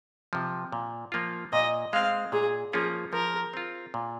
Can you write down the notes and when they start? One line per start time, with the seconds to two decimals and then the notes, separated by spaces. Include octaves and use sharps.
0.33 C3 F3
0.72 A#2
1.12 F3 A#3 F4
1.53 A#2 D#5
1.93 G#3 C4 F5
2.32 A#2 G#4
2.73 F3 A#3 C#4 F4 G#4
3.13 F3 A#4
3.54 C4 F4
3.94 A#2